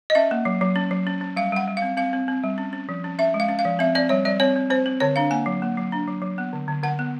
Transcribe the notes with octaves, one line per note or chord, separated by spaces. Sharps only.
D#5
C#4 E5
A#3
F#3
F#3
C#4
F#3
C#4
C#4
G3 F5
G3 F#5
G3
F5
C4
C4 F5
C4
C4
G3
C#4
C#4
F3
C#4
C#4 E5
G#3
F5
C#4
F5
F3
C4 E5
C4 D5
G3 C#5
G3 D5
C4 C#5
C4
C4 C5
C4
D3 C#5
D4 F5
A#3 G#5
F#3
A#3
F#3
D4
F#3
F#3
B3
D3
D3
D3 F#5
B3